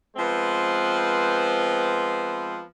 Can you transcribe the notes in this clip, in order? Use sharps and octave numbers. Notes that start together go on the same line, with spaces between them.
F3 G#3 B3 C4 B4 C5